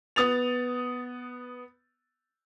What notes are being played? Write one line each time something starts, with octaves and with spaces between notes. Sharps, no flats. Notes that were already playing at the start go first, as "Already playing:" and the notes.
B3 D#6 A6 F7